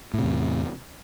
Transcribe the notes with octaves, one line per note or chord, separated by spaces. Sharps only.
E2 A2 C3